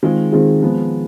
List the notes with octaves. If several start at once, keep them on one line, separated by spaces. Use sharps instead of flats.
D#3 G#3 C4 F4 G#4
D#3 G#3 C4 F4 G#4
F3 G#3 B3